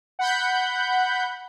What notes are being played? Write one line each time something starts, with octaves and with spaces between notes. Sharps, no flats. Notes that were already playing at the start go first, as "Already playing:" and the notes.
F#5 B5 G6